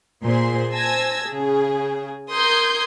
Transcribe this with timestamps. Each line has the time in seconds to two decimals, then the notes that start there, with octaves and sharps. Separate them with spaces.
0.23 A#2 G#4 C5 C6
0.72 C5 G#5 A5 E6 G#6 A#6
1.27 C#3 G#4
2.31 A#4 C6 D#6 G6 G#6